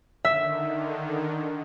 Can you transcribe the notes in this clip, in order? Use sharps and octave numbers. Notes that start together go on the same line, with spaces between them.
D3 D#3 E5